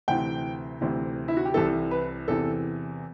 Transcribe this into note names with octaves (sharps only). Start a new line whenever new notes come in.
D2 C3 E3 G5
D2 C3 E3
E4
F#4
G4
C2 C3 E3 A4
B4
E2 C3 E3 A4